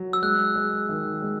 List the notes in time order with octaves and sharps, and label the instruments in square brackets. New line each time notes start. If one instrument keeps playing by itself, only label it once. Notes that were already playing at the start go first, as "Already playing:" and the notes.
Already playing: [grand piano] F#3
[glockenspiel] E6
[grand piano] G#3 [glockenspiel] F#6
[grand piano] G#3
D#3
G#3